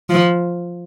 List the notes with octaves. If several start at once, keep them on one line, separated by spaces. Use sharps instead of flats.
F3